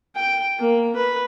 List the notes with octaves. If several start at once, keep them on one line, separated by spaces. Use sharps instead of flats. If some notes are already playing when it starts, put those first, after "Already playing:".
G5
A#3
B4